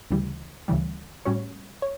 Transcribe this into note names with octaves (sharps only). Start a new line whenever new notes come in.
D2 C#3 E3 G3
D2 C#3 E3 G3
A2 G3 C#4 F#4 C#5
C#5